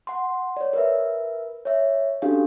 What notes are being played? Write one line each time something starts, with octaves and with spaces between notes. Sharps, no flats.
F#5 C6
C#5 D5
A#4 B4 E5
C#5 E5
C#4 D4 F#4 G4 A4 F5